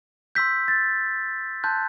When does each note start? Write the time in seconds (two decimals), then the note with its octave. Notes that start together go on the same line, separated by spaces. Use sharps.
0.35 C6 E6 G6 B6
0.68 A6
1.64 A5 C6 F#6 G6